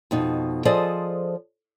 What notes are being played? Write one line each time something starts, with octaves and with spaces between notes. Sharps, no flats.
F2 B2 D#4
F3 G#4 A4 C5 D5 D#5